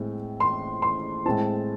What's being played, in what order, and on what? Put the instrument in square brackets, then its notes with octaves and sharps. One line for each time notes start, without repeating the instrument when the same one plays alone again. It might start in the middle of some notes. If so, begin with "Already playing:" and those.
Already playing: [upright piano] A2 G#3 C4
C6
C6
A2 G#3 C4 A5